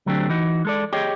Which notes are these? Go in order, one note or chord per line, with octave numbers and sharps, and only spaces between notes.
D3 F#3 A3 C4 D4 G4
E3 D#4 F#4
G#3 A4 D5
G4 G#4 C#5 D#5 G5